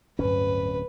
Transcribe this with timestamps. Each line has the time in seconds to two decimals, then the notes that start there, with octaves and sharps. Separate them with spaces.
0.19 D1 G2 F#3 C#4 B4